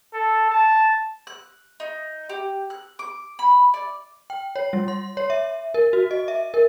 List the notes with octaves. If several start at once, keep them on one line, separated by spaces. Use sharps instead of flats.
A4
A5
F#6
D#4
G4
F#6
D6
B5
D5
G5
C#5
G3
C6
C#5
E5
A#4
F#4
D#5
E5
A#4